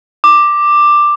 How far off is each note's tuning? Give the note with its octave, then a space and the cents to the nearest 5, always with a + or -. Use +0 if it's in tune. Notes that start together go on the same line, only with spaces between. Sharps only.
D6 +5